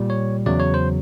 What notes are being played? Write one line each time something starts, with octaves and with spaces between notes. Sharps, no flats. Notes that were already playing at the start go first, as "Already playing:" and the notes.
Already playing: A#2 G3
C#5
E2 C#3 F#3 D5
C#5
C5